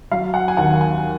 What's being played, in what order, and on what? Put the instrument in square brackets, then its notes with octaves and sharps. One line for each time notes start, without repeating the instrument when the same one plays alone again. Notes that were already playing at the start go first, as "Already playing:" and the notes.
[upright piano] F#3 F5
F#5
G#5
D#2 F#5
G#5